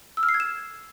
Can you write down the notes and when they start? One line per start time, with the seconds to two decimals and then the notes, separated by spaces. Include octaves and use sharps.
0.17 E6
0.23 F6
0.29 C7
0.34 G#6
0.40 E7